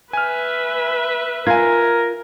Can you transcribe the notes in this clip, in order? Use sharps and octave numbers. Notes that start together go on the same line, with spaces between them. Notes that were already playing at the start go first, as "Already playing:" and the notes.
B4 E5 G#5 F6
F4 A#4 G#5 G#6